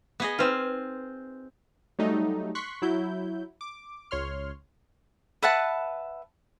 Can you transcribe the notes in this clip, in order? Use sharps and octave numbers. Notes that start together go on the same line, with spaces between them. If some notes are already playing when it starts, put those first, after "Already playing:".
B3 G#4 D#5
C4 D#4 F4 B4
F#3 G3 A3 D#4
C6 C#6 F#6 B6
F#3 E4 G6
D6
C#2 C#5 C6 F6
B4 E5 F#5 A5